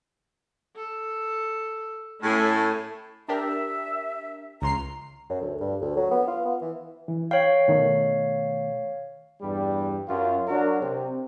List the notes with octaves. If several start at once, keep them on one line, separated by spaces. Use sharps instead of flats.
A4
A2 A3 C#4 G#5
D4 G4 A#4 E5
C#2 A#5 C6 C7
F#2
D2
G2
D2
F#3
B3
F4
B3
E3
E3
C#5 F5 G5
B2 D#3 A3
E2 G2 G3
F#2 F4
F#3 D4 F#4 A#4
C3